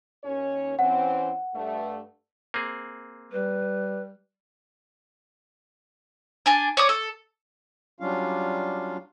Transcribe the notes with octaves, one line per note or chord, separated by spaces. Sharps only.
D#2 C#4 C#5
E3 C4 C#4 F#5
G2 A3
A#3 C4 G#4
G3 B4
D4 G#5 A5
C#5 D5 D#6
A4
F#3 G3 C#4 D4 F4 F5